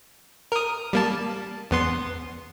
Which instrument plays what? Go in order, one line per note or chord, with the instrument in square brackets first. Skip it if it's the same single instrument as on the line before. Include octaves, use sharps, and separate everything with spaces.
[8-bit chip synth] A#4 D#6
G3 A#3 A5
E2 B3 C6